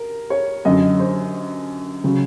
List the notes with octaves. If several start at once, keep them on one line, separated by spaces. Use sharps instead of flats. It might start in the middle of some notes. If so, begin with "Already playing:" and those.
Already playing: A#4
C#5
F#2 D3 F#3 D#5
C5
C#3 F#3